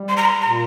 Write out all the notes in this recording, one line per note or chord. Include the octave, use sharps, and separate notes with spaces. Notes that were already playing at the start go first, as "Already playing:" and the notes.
Already playing: G3
C6
A#5
C6
A#2 A#5